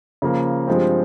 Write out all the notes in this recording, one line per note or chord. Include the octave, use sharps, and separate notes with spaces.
C#3 F3 A#3
G2 F3 G#3 C4